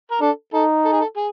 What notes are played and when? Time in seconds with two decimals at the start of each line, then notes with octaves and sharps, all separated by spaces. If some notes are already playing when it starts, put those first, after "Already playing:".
0.11 A#4
0.21 D4 A4
0.54 D#4 A4
0.85 A4
0.93 G#4
1.01 A4
1.17 G#4